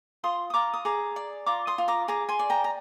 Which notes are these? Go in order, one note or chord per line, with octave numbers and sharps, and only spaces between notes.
F4 C6 D#6
D#6
F4 A#5 D6
D#6
G#4 A#5 D6
D5
F4 A#5 D6
C6 D#6
F4
A#5 D6
G#4 A#5 D6
G#5 C6
D5
G5 A#5
A#5